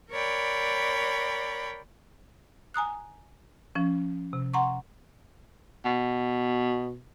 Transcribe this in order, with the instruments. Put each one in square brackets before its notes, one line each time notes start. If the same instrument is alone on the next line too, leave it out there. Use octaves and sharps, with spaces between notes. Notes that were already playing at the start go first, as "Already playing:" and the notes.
[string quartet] A#4 C#5 D5 G5 B5
[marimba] G#5 A#5 D#6 F#6
F3 C#4
C3
F#5 A#5 C6 C#6
[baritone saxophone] B2